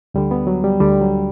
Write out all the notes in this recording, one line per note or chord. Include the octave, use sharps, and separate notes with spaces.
D2 D3 G3
B3
F#3
G3
D2 D3 G3
F#3